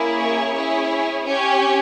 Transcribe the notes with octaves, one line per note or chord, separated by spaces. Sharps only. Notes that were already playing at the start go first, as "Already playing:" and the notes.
Already playing: A#3 C#4 E4 G#4
C#5
C#4 E4 G#4
C#4 G4 C#5